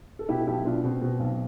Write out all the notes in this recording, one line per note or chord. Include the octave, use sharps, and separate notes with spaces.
A4
B2 E4 G4
B1 E4 G4
B2 D4 F4
B2 C4
B2
B1